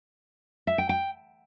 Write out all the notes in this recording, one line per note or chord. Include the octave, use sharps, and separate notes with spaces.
E5
G5
G5